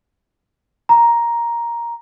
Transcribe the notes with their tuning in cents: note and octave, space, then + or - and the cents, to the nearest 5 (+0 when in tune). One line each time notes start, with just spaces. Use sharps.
A#5 +10